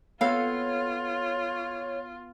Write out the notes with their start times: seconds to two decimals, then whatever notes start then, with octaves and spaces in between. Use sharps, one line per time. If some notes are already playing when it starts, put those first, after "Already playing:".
0.21 B3 C4 F4 A4 C#5 F5